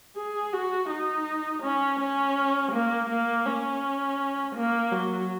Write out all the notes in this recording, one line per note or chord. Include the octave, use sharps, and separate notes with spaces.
G#4
F#4
D#4
C#4
C#4
A#3
A#3
C#4
A#3
F#3